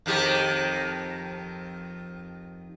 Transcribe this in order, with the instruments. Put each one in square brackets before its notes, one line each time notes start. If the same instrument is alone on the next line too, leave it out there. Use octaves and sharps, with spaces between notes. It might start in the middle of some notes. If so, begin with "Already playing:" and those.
[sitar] F2 D#3 G4